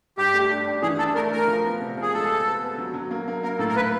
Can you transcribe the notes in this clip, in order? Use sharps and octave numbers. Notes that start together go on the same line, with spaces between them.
G2 G4
A3
D4
D4
E3 G#4
D4 A4
A3 A#4
A3 A#4
F3
B3
C3
F3 G#4
G#3 A4
G#3
B3
B3
F#3
F#3
A#3
A#3
A#3 A#4
A2 A4
A#4
A#3 B4